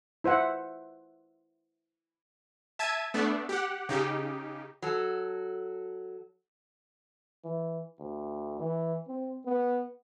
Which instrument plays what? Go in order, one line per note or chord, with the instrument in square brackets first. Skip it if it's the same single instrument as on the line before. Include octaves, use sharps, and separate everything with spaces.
[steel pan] E4 C5 E5 F#5
[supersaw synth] E5 A5 G#6 D#7
A3 B3 D4
G4 F#5
C#3 D#4 G4
[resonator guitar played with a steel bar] F#3 A4
[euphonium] E3
D2
E3
C4
B3